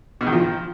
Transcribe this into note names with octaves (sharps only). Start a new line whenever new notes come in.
B2
D#3
F3